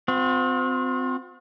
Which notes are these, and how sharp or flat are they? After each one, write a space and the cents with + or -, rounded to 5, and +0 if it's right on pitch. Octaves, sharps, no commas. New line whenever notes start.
C4 -30 F4 +45